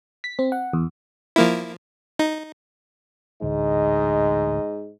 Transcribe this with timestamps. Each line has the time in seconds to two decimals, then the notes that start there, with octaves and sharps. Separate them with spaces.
0.24 B6
0.39 C4
0.52 F#5
0.73 E2
1.36 F3 A#3 E4
2.19 D#4
3.42 A1 D2 G#2 D#5